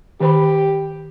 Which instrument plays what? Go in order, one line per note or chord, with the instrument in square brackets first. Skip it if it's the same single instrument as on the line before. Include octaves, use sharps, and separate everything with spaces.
[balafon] D#3 C5 B5 [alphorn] G4